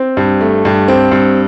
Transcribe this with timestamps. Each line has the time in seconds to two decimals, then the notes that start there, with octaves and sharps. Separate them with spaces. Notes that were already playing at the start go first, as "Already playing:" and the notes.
Already playing: C4
0.17 G2
0.41 A3
0.65 G2
0.88 C4
1.12 G2